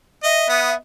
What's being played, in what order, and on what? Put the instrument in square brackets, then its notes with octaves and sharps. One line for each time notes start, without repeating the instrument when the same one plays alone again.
[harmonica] D#5 [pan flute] E5
[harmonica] B3 D#6